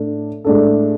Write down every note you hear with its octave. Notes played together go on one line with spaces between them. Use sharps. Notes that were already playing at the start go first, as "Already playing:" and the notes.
Already playing: A2 D4 A4
A2 G#3 D4 A4